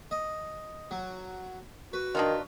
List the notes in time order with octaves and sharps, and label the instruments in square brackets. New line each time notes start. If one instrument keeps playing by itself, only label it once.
[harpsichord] D#5
F#3
[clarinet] F#4 [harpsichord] B4
[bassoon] D#3 [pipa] D4 D#4 F4